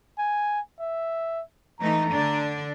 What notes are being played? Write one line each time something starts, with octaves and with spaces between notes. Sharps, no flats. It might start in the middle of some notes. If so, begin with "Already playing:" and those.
G#5
E5
E3 A3 D#4 A#5
D3 D4